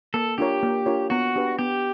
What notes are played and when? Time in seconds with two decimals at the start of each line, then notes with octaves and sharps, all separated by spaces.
0.14 A#3 A4
0.38 D4 F4 G4 A#4 C#5
0.63 A#3
0.86 D4 F4 A#4 C#5
1.10 B3 F#4
1.35 D4 G4 B4
1.59 B3 G4